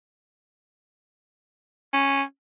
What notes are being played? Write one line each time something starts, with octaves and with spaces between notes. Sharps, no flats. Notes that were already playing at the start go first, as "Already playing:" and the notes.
C#4